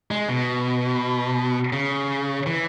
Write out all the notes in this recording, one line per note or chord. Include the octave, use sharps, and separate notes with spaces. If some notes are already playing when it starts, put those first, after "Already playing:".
G#3
B2
C#3
E3